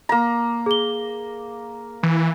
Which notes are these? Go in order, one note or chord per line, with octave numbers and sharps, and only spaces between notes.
A#3 A#5
G#4 G7
E3